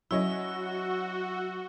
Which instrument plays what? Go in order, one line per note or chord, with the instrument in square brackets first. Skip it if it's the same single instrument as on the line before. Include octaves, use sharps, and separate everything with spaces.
[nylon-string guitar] F#3 C#4 [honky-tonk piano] E4 C#5 D#5 [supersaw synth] F#4 [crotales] E6